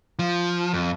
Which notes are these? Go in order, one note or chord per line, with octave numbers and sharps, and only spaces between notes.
F3
F2